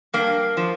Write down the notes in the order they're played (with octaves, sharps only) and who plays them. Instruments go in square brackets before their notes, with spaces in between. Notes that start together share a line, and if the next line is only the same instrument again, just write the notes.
[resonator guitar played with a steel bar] G2 A#3
F3